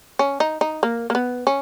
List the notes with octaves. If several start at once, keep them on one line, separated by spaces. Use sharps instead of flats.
C#4
D#4
D#4
A#3
A#3
B3
C#4